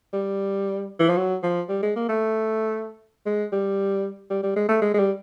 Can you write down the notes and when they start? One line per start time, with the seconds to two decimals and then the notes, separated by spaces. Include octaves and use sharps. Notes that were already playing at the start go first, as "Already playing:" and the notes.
0.13 G3
0.99 E3
1.09 F3
1.17 F#3
1.43 F3
1.69 G3
1.83 G#3
1.96 A#3
2.09 A3
3.26 G#3
3.52 G3
4.30 G3
4.43 G3
4.56 G#3
4.69 A3
4.82 G#3
4.94 G#3
4.99 G3